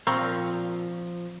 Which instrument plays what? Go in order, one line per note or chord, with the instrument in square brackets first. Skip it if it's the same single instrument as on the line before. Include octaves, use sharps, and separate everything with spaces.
[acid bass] A#2 [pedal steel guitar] F3 F5 [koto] C4 [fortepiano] A#5 C6 C#6